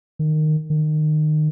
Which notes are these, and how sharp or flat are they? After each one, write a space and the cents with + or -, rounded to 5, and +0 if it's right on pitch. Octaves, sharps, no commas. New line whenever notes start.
D#3 -15
D#3 -25